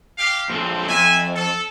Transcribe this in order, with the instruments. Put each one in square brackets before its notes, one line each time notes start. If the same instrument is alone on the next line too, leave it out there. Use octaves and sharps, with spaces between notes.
[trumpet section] G4 F5
[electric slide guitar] A#2 F3 A4 [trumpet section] C4
[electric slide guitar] F2 [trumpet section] E5 G#5
[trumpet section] A4